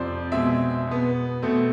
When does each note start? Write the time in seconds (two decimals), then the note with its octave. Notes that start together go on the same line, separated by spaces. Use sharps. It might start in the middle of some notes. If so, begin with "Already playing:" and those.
Already playing: F2 C3 F3 C5 D5
0.32 B2 G#3 C4 E5
0.87 B2 B3
1.42 B2 A3 C4